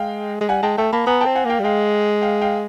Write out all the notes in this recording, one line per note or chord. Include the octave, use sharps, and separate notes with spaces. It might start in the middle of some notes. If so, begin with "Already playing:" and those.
Already playing: G#3 F5 G5
G#3
G3 F#5 G#5
G#3 G5 A5
A3 G5 A5
A#3 A5 B5
B3 G#5 A#5
C4 G5 A5
F#5 G#5
A#3 F5 G5
G3
G#3 F5 G5
F5 G5
F5 G5